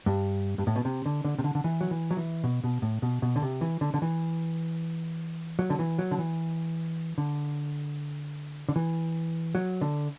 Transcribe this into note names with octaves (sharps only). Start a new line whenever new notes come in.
G2
G2
A2
B2
C3
D3
D3
C3
D3
D3
E3
F#3
E3
F#3
E3
B2
B2
A2
B2
B2
D3
C3
E3
D3
D3
E3
F#3
D3
E3
F#3
D3
E3
D3
D3
E3
F#3
D3